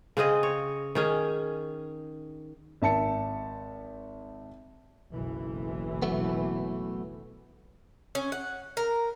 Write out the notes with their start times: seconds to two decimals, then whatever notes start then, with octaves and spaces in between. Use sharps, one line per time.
0.17 C#3 C4 G#4 D#5
0.43 C#5
0.95 D#3 C#4 G#4
2.82 G#1 E5 A5 C#7
5.10 F#1 B1 E3
6.02 F#3 A3 B3
8.15 C#4
8.32 F#5
8.77 A#4